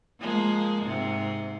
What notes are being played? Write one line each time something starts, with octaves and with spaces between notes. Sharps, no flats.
F3 G#3 A#3
G#2 C3